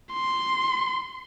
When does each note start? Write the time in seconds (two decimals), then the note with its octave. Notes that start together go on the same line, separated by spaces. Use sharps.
0.12 C6